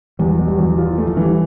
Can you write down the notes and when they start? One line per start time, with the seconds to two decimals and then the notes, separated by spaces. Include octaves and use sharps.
0.19 E2 G3
0.34 B2 F#3
0.48 G3
0.58 E2
0.63 F#3
0.78 E3 F4
0.93 E3 A3
1.07 F3
1.17 E3 G3